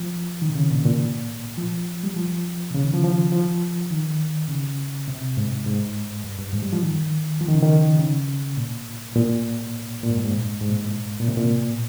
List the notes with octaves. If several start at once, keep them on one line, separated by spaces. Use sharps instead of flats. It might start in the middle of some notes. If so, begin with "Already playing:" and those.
Already playing: F3
D#3
C3
C#3
A#2
A#2
F3
G3
F3
C3
C#3
D#3
F3
F3
F3
D#3
C#3
C3
G#2
G#2
G2
G2
G#2
G3
F3
D#3
F3
D#3
C#3
D#3
C#3
A#2
A#2
A#2
G#2
G2
G#2
G#2
A#2
G#2
A#2
C3
A#2